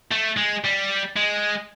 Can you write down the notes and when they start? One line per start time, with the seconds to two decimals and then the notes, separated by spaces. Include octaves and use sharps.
0.12 A3
0.37 G#3
0.64 G3
1.16 G#3